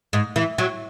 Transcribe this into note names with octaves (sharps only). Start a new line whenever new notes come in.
G#2
E3
F#3